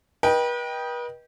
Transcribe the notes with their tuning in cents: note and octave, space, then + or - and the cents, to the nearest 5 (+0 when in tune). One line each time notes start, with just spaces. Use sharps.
B4 -40 D#5 +0 G5 +0